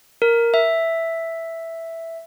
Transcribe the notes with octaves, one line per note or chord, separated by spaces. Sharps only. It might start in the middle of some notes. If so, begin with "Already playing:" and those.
A#4
E5